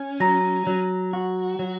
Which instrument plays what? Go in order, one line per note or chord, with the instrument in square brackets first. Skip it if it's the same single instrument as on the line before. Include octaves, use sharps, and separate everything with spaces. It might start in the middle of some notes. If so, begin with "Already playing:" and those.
Already playing: [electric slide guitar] C#4
[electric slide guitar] F#3 [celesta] A#5 A#6
[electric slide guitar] F#3
F#4
F#3